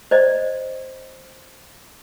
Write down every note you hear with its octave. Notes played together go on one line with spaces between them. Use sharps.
C5 D5 D#5